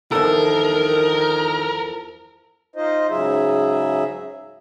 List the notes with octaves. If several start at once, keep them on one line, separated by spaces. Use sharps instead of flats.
E2 G2 D#3 F3 A4 A#4 E6
D#4 F4 C5 D#5
G#2 C#3 F#3 G#4 E5